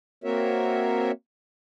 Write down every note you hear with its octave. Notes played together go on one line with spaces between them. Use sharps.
A#3 C4 F#4 A#4 C#5 E5